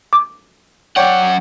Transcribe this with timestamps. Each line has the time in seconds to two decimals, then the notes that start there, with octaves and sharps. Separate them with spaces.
0.13 D6
0.96 F#2 C#5 D5 F#5 G5